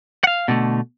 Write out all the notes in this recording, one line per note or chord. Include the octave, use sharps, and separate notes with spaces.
F5 F#5
B2 D3 A3